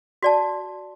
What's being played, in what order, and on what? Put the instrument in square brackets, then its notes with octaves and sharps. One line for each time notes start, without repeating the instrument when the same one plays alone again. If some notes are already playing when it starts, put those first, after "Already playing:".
[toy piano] F#4 D5 A5